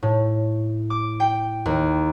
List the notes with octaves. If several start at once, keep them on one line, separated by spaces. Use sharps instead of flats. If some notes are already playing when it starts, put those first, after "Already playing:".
A2
D6
G5
D#2